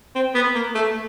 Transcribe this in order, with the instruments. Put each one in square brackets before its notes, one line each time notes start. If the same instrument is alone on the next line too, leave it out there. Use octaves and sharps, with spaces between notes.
[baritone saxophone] C4
B3
A#3
A3